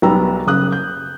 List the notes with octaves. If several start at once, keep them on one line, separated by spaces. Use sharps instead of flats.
B1 G3 B3 A#5 E6
F#1 C#3 D#6 F#6
G6